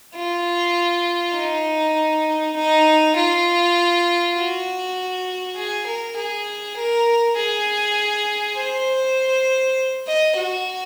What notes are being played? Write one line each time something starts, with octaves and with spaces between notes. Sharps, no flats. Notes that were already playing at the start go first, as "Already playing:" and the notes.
F4
D#4
D#4
F4
F#4
G#4
A#4
G#4
A#4
G#4
C5
D#5
F#4